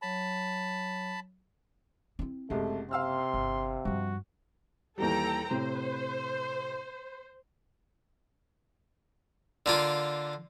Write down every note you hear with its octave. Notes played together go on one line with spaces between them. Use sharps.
F#3 C#5 A5 B5
C4 E4
F#1 C2 C3 G#3 A3
C3 F5 C6 E6 F6
G1
G2 F3 F#4
D#2 E3 G3 A4 G5 A#5
A2 C3 C5
D3 A#3 F4